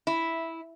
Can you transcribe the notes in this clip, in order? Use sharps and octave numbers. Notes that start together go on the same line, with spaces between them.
E4